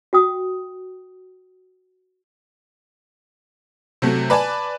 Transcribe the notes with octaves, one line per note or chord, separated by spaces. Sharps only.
F#4 G5 D#6
C3 F#3 A3
B4 D5 G#5 A5